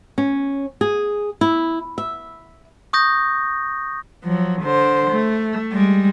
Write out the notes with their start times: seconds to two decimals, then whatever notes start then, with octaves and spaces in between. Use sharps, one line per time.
0.18 C#4
0.81 G#4
1.41 E4
1.98 E5
2.93 C#6 D#6 G6 A#6
4.24 F3 F#3
4.62 D3 C5
5.11 A3
5.72 G3 G#3